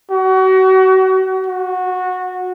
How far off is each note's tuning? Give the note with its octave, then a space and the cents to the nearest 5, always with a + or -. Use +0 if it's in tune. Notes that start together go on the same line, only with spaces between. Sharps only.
F#4 +35
F#4 -15